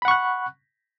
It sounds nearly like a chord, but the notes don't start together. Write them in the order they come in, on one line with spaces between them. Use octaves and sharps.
B5 F#5 C#6 F#6